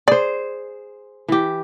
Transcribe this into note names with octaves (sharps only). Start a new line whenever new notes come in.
G#4 C5 D5
E3 G4